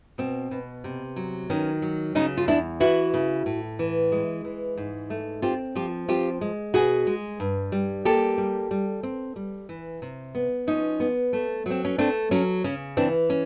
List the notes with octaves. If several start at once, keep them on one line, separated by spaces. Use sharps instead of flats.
B2 C4
B2
C3
F#3
D#3 C#4
F#3
C#3 C#4 D#4
F4
E2 D4 E4
E3 E4 F#4
C#3
A2
E3
G#3
E3
G#2
A3
C4 F4 G4
F3 F4 G4
C4 F4 G4
G#3
B2 F#4 G#4
G#3
G2
G3
A#3 G4 A4
G3
G3
C4
G3
E3
C3
B3
F3 C#4 D#4
B3
A3
F#3 C4
C#4
A3 C4 D4
F#3 C#4
C#3 C#4
E3 C4 D4
C#4